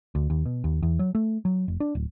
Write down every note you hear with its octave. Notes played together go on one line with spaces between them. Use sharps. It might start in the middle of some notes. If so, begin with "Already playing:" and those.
D2
D#2
B2
D#2
E2
F#3
A3
F#3
F1
D4
D1